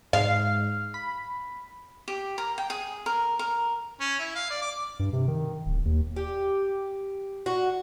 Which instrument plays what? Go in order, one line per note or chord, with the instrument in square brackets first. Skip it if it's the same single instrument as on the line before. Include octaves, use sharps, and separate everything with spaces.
[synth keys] G#2 [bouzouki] F5
[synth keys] B5
[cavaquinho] G4
A#4
G5
G#4
A#4
A#4
[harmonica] C#4
E4
F5
D5
D6
[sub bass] G2
C3
D#3
D1
D#2
[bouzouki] G4
F#4